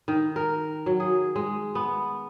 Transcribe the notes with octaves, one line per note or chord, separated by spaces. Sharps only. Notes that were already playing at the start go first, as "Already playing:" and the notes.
D#3
A#4
F#3
G#4
G#3
B3